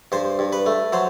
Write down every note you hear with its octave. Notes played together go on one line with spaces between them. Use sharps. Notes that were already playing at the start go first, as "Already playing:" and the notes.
G2 C5
G2
B4
A3
F#3 C5